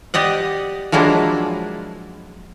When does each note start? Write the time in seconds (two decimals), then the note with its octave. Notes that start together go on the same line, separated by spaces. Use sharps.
0.14 G4 D5 D#5 F#5
0.92 F3 F#3 G#3 A#3 D4 E4